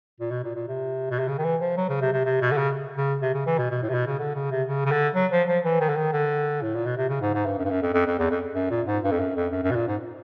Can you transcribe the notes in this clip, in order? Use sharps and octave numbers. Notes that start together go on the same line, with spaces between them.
A#2
B2
A#2
A#2
C3
B2
C3
C#3
D#3
E3
F3
F#3
C#3
C3
C3
C3
B2
D3
C#3
C#3
C3
C#3
E3
B2
B2
A2
C3
B2
C#3
D3
C#3
C3
C#3
C#3
D3
F#3
F3
F3
E3
D#3
D3
D#3
D3
A2
A#2
B2
C3
C#3
G#2
G#2
G2
F#2
G2
F#2
F2
F2
F2
E2
F2
F#2
A#2
G#2
G2
F2
F#2
F2
F#2
F#2
B2
A#2
G#2